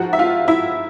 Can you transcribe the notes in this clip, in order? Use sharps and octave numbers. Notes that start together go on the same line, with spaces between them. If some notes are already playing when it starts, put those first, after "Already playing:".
Already playing: G#2 F3 F#4 F#5
E5
F4 F5
E4 E5